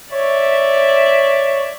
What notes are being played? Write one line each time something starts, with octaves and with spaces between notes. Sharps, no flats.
C#5 D5 E5